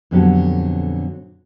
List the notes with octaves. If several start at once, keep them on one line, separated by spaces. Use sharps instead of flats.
F2 A#2 D3 F#3 B3 G4